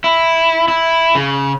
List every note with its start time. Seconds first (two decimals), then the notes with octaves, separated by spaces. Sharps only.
0.04 E4
0.68 E4
1.15 C#3